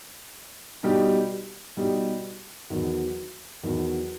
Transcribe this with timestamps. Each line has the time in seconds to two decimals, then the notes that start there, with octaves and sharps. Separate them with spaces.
0.83 B2 G3 D#4 G4
1.77 B2 G3 D#4 G4
2.70 E2 D#3 F#3
3.63 E2 D#3 F#3